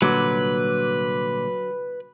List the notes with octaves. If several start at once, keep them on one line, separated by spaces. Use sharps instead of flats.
C2 A#2 D3 F#3 B4